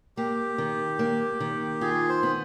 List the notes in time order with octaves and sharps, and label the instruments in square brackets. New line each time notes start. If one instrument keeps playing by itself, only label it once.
[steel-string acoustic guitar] A#3 [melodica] G4
[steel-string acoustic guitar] D#3
A#3
D#3
[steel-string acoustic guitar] F4 [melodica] G#4
[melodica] C5
[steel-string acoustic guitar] B3